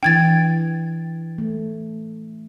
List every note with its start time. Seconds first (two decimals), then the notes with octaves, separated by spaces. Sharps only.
0.03 E3 D4 G5 G#6 A6
1.38 A3